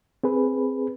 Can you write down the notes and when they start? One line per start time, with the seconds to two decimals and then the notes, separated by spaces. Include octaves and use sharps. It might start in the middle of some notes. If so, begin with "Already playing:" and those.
0.23 C4 G#4 B4